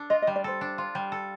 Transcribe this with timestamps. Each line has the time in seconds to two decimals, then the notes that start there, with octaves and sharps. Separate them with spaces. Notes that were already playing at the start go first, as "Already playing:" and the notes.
Already playing: D4 A4
0.10 F4 D#5
0.22 D#5
0.27 G3
0.36 D5
0.44 A4 C5
0.61 D4
0.78 F4
0.95 G3
1.12 A4